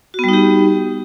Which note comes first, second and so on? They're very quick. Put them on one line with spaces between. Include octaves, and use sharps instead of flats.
F#4 B3 G3 D#4 G4